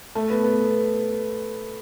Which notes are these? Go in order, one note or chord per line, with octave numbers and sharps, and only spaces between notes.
A3
B3
B3